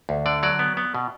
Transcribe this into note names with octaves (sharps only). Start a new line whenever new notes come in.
D2
D3 D5
F#3 D5
B3
B3
B2